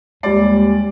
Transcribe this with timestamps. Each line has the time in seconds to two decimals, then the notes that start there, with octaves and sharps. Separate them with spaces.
0.23 D#2 G3 G#3 D5